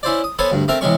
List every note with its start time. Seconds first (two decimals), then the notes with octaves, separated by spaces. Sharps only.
0.03 C#4 E4 C5 D5
0.24 D#6
0.39 B3 A4 C5 C#5 G#5 B5
0.52 D2 G2
0.68 A3 C4 A#4 E5
0.81 E2 C3 G#3 C#4 C#6